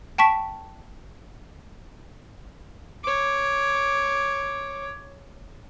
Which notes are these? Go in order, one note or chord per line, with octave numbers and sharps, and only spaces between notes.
G5 A5 C#6 B6
C#5 D6